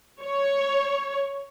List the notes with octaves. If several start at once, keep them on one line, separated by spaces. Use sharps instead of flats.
C#5